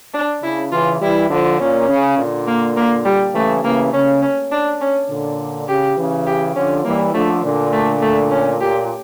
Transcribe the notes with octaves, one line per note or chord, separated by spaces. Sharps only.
D4
C#3 E4
C#3 E3 F4
E3 G3 E4
D3 F3
A#2 C#4
C#3
A#2 D3
A#3
A#3
G3
C#3 E3 A3
C#3 E3 A#3
C#3 C#4
C#4
D4
C#4
A#2 D3
C#3 G4
C#3 E3
G4
D3 F3 C#4
E3 G3 A#3
D3 F3 A3
A#2 D3
A3
A3
C#4
A#2 G4